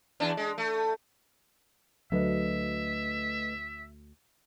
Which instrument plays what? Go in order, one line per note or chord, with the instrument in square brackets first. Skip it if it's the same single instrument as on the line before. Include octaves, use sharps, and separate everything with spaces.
[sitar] E2 D4
G#3
A3
[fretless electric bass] D2 [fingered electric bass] F#3 [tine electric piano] A3 B4 D#5 [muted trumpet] E5